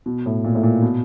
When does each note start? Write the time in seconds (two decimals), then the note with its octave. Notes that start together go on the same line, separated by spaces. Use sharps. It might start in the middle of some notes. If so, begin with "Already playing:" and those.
0.06 B2
0.26 A2
0.44 A#2
0.55 A2
0.63 A#2
0.82 B2